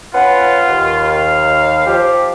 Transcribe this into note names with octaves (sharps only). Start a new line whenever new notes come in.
C#4 F4 B4 F#5
D#2
F5
F3 G4